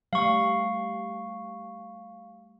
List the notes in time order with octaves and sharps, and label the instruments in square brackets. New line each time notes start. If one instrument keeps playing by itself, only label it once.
[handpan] G3 A3 [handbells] F5 C#6